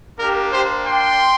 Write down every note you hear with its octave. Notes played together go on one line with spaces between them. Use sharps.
A#3 D4 G4 A#4
G4 C5
G5 C6